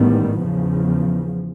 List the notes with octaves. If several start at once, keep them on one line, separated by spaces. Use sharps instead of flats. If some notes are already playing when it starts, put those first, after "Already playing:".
Already playing: A1 G#2 D#3 G3 B3
E2 C#3 F3